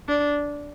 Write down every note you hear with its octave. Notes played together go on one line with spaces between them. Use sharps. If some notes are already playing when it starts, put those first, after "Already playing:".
D4